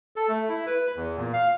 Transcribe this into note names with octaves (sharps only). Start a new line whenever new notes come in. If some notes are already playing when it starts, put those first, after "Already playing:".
A4
A3
E4
B4
E2
A#2
F5